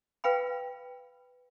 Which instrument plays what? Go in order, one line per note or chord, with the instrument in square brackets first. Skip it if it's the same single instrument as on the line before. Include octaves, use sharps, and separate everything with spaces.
[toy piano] B4 F5 G5 B5